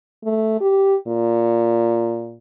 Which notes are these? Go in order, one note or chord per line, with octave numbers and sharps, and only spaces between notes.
A3
G4
A#2